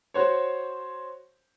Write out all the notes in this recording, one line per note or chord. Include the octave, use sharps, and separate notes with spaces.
F#4 C5 C#5